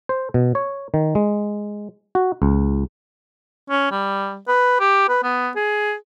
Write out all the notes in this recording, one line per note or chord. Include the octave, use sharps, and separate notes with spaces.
C5
B2
C#5
D#3
G#3
F#4
C#2
C#4
G3
B4
G4
B4
B3
G#4